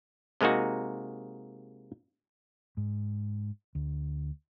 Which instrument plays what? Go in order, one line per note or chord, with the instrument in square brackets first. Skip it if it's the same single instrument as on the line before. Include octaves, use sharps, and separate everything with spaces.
[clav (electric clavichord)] C3 G#3 A#3 D#4 F#4
[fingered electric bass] G#2
D2